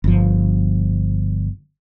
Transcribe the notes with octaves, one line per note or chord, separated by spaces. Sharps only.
G1 F3